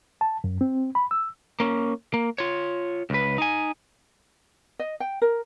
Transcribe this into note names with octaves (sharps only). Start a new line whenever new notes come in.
A5
F#2
C4
B5
E6
A#3 C#4
A#3
F4 C#5
C#2 B4
D#4 G#5
D#5
G5
A#4